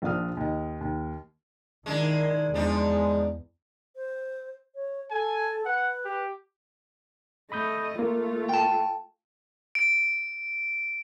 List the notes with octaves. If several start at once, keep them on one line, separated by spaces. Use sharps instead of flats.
A#1 F3 D4 D#6 F6
D#2 D#5
D#2
D#3 G#3 D4 E4
E2 F3 G#3 D4 D#4
C5
C#5
A4 G#5
B4 F#5
G4
A3 D#5 B5 D#6 G6
A3 A#3 F4
G5 A5
D7